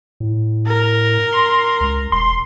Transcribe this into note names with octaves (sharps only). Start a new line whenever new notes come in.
A2
A#4
C6
C#2
E1 C6